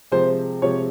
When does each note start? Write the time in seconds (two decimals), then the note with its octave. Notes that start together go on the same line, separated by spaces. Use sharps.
0.12 C3 F3 G#3 C5
0.62 C3 F3 G#3 C#5